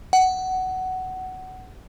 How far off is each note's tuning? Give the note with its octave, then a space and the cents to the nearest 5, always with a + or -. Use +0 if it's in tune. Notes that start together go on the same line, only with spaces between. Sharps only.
F#5 +15